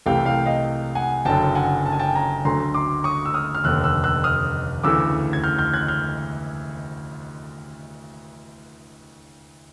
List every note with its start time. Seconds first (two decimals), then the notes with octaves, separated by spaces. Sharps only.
0.06 C2 C3 E3 A3 F5 G5
0.25 F5 G5
0.46 D#5 F5
0.95 F#5 G#5
1.25 F#1 F#2 D3 F#3 G5 A5
1.55 F#5 G#5
1.86 A5
1.92 G#5
1.99 G5 A5
2.15 G#5 A#5
2.45 D2 D3 F#3 A3 A#5 C6
2.74 C6 D6
3.04 C#6 D#6
3.25 E6
3.34 D#6 F6
3.55 F6
3.64 F1 D#2 D3 E6 F#6
3.84 E6 F#6
4.04 E6 F#6
4.24 D#6 F6
4.83 D2 C#3 E3 A3 D6 E6
5.33 G#6
5.43 F6 G6
5.59 F6 G6
5.74 F#6 G#6
5.88 F6 G6